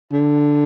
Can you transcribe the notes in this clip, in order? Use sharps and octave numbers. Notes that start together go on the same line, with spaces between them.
D3